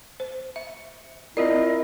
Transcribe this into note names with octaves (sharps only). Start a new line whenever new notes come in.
C5
E5
C4 E4 F4 A#4 D5 D#5